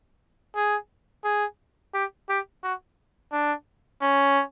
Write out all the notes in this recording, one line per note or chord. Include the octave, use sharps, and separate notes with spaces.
G#4
G#4
G4
G4
F#4
D4
C#4